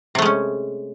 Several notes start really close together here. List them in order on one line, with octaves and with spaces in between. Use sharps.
C3 A3 G#3 C#4